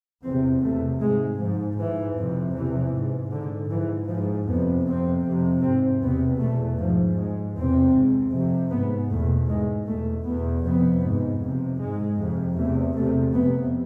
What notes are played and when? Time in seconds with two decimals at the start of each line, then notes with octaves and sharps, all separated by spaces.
0.23 E2 C3 C4
0.62 E2 C3 A3
1.00 G#2 G#3
1.39 G#2 F3
1.77 G#2 E3
2.17 F2 C3
2.55 E2 C3 E3
2.94 G#2
3.31 G#2 D3
3.70 G#2 E3
4.09 G#2 F3
4.47 F2 C3 B3
4.86 F2 C3 C4
5.24 F2 C3
5.62 G#2 C4
6.01 E2 C3 B3
6.39 E2 B2 A3
6.78 G#2 F3
7.17 G#2 G#3
7.56 E2 C3 C4
7.94 G#2
8.33 F2 C3
8.71 G#2 B3
9.10 E2 B2 A3
9.48 G#2 G#3
9.86 E2 B2 A3
10.26 E2 B2 B3
10.64 F2 C3 B3
11.02 G#2
11.41 F2 C3
11.79 G#2 G#3
12.18 F2 C3
12.57 E2 C3 A3
12.95 E2 C3 A3
13.34 F2 C3 B3